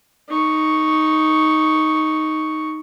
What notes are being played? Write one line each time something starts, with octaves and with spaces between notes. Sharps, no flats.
D#4 C#6